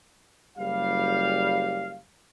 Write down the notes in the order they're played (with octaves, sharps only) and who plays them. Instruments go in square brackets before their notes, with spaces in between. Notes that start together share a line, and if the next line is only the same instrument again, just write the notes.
[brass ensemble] F#1 G3 F5